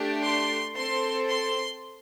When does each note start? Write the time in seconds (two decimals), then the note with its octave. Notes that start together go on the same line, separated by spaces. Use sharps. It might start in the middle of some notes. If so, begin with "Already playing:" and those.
Already playing: A3 D4 G4
0.24 C6
0.77 C4 A4 C6
1.29 C6